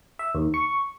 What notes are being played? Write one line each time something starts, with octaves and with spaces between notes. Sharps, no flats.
E5
D#2
C#6